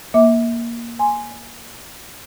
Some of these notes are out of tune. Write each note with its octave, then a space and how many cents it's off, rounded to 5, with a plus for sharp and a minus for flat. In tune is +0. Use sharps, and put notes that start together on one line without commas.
A#3 +10 E5 -25 D6 +0
G#5 +0 C6 +0